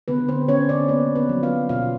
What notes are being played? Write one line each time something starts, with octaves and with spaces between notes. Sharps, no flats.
D3 B3 B4
C4 C5
D3 C#4 C#5
D4 D5
A#3 B3 B4
B3 B4
F#3
F4 F5
B2 F4 F5